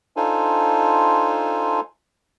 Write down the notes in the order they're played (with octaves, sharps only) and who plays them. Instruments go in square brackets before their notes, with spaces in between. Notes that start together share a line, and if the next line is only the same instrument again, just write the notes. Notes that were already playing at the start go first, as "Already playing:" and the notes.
[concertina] D4 D#4 F4 A4 C5 G#5